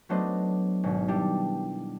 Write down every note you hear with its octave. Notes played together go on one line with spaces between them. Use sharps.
F#3 A3 B3 D4 C5 D#5
G#1 B2
G3 D4 E4 G4